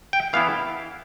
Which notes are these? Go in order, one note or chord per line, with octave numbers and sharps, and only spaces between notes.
G5
E3 B3 E4 F5